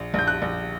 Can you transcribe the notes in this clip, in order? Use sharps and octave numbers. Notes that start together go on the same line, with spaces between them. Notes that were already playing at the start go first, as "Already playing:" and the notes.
Already playing: A#1
A#1 G6
F#6
A#1